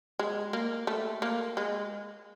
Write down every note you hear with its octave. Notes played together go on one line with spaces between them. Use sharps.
G#3
A#3
A3
A#3
G#3